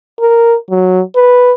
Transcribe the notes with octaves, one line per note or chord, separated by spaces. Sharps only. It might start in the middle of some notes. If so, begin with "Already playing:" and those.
A#4
F#3
B4